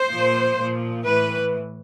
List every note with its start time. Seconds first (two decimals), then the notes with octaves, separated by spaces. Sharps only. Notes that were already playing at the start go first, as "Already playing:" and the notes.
Already playing: C5
0.09 A#2 F3
0.58 A#2 F3
1.06 A2 E3 B4